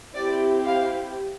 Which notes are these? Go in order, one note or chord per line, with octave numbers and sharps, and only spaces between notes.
C4 E4 G4 D5
F5